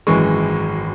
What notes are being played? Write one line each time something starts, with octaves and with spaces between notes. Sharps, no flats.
G#1 F#2 E3 G#3 C#6